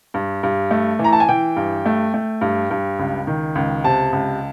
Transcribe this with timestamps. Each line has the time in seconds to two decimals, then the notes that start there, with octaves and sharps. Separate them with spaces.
0.14 G2
0.43 G2
0.71 A3
0.99 E3
1.04 A#5
1.13 A5
1.20 G#5
1.29 E3 G5
1.56 G2
1.86 A3
2.14 A3
2.41 G2
2.71 G2
2.99 C#2
3.27 D#3
3.55 C#2
3.84 C3 A5
4.13 C#2